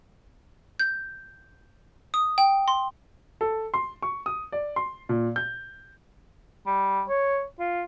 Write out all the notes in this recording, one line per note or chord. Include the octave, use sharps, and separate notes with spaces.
G6
D#6
G5
C6
A4
C6
C#6
D#6
D5
C6
A#2
G6
G3
C#5
F4